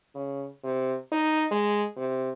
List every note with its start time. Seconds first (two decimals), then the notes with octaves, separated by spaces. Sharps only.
0.15 C#3
0.64 C3
1.12 D#4
1.51 G#3
1.97 C3